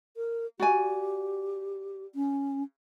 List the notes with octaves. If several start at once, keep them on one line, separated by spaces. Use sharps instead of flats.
A#4
F#4 G4 D5 G#5
C#4